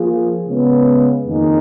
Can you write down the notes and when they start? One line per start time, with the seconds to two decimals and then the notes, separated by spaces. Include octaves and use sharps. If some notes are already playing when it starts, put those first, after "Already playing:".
Already playing: F3 A#3 F4 G#4
0.47 C#3 G#3 B3
1.25 F2 D#3 A#3 D#4 G#4